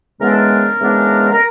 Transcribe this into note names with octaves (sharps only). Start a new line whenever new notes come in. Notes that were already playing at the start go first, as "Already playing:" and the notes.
C#3 E3 G#3 B3 D4 A#4
A4
A#4
C#3 E3 G#3 B3 D4
A#4